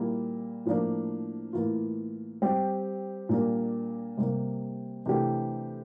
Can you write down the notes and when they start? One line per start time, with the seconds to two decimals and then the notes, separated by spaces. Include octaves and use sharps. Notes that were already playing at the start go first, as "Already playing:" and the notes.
Already playing: A#2 G3 A#3 E4
0.65 A2 F3 A#3 D4
1.53 A2 E3 A#3 F4
2.42 G3 C4 G4
3.29 A#2 G3 A#3 D4
4.18 C3 G3 A#3
5.06 C3 E3 A3 D4 G4